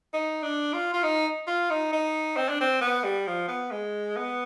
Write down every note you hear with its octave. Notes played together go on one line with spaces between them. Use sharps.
D#4
D4
F4
F4
D#4
F4
D#4
D#4
C4
D4
C4
B3
G3
F3
B3
G#3
B3